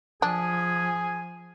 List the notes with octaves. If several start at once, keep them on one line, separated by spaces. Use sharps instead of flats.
F3 D4 G#4 G#5